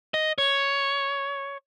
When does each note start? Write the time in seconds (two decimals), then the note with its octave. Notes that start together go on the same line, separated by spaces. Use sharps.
0.14 D#5
0.38 C#5